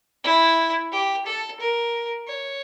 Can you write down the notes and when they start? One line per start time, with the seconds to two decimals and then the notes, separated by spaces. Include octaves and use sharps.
0.24 E4
0.92 G4
1.26 A4
1.60 A#4
2.28 C#5